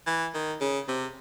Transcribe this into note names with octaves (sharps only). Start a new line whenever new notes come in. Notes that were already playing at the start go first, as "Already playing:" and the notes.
E3
D#3
C#3
C3